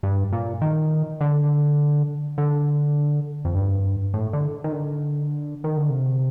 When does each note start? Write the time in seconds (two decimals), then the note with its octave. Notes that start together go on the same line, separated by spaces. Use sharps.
0.03 G2
0.33 A#2
0.61 D#3
1.21 D3
2.38 D3
3.45 F2
3.55 G2
4.14 A2
4.33 D3
4.64 D#3
4.72 D3
5.64 D#3
5.77 D3
5.90 C3